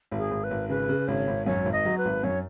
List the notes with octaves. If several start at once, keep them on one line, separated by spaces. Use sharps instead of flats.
G#1
G#4
G#1
B4
G#1
C#3 B4
C#3
G#1 C#5
G#1
F#2 C#5
G#1
D#5
F#3
B4
G#1
F#2 C#5